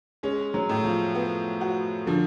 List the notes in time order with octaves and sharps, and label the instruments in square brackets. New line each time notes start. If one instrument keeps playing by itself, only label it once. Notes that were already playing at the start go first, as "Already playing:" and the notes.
[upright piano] G#3 [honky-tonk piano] C#4
[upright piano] F#3
[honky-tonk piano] A2
[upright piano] F3
[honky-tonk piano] B3
F#4
[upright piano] D3 [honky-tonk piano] F3